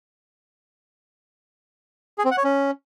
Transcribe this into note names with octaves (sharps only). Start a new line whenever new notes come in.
G#4
C4
F#5
C#5
C#4